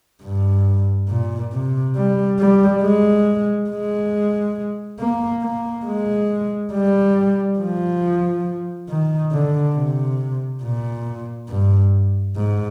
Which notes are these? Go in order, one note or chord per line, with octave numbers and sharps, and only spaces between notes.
G2
A#2
C3
G3
G3
G#3
G#3
A#3
A#3
G#3
G3
F3
D#3
D3
C3
A#2
G2
G#2